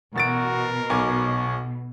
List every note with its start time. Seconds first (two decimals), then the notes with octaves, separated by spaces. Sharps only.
0.16 A1 B2 F#4 A#4 A6 D7
0.90 B1 C#5 G#5 D6